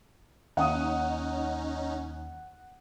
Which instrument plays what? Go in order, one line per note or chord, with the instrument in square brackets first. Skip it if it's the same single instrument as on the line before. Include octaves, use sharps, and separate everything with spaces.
[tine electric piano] D#2 [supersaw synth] C#4 D#4 [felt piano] F#5 D#6